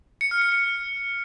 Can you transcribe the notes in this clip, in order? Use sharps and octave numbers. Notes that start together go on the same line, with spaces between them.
C#7
F6
C#7
C#7